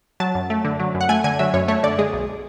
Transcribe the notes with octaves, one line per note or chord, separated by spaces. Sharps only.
F#3 A5
F#2
A3
D3
F#3
F#2
F#5
A3 G#5
D3 G#5
F#3 E5
F#2 C#5
A3 C#5
D3 D5
G#3 G#4
B1